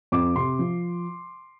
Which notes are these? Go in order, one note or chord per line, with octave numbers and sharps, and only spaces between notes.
F2 D6
C3 C6
F3